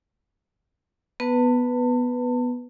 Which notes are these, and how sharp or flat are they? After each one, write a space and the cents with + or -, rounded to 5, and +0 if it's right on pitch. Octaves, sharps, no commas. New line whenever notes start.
B3 +0 B4 +0 A5 +35